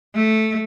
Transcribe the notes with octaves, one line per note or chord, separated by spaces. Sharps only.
A3